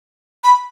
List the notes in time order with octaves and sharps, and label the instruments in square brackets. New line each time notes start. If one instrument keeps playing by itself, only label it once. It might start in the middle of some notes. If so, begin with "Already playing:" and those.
[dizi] B5